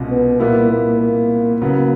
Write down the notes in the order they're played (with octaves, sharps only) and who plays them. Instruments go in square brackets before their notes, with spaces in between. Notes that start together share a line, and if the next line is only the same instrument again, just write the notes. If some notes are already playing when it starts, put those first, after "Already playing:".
Already playing: [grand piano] C2 B2 G#3 C#4 F4
[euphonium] B3
[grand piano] A#2 G3 B3 E4 [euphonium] A#3
[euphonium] A#3
A#3
[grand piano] C#3 F#3 B3 [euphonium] A#3